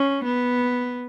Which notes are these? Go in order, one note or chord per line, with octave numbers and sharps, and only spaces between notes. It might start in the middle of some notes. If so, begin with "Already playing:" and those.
Already playing: C#4
B3